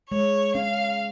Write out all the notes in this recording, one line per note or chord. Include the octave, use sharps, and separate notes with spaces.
G#3 C#5
C#4 F5